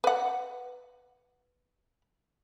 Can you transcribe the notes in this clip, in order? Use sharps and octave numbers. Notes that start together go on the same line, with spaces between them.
B4 F#5